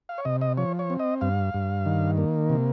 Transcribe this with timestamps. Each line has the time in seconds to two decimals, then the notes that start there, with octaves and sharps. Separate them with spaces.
0.09 F5
0.18 C#5
0.25 C3 D#5
0.41 D#5
0.57 F3 C#5
0.79 C#5
0.90 C4
1.00 D#5
1.21 G2 F5
1.54 G2
1.86 D#3
2.18 A#3
2.50 C3